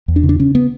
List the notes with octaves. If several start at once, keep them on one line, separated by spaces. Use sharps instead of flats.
E2
D4
C#3
D4
C#3 C#4
B3